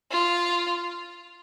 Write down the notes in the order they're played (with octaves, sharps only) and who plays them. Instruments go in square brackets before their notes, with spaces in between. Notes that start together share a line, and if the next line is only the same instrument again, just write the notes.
[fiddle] F4